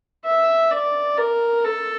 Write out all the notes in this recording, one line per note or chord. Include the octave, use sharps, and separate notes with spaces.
E5
D5
A#4
A4